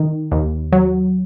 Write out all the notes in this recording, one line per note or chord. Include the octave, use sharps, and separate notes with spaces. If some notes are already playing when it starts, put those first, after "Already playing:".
Already playing: D#3
D#2
F#3